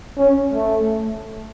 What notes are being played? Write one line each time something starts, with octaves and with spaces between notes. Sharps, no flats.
C#4
A3